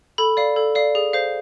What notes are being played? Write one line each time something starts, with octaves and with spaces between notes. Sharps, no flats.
A4 B5
D5 F5
A4
D5 F5
G#4
C5 F5